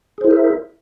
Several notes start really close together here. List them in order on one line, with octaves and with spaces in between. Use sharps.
G#4 C5 E4 A#4 E5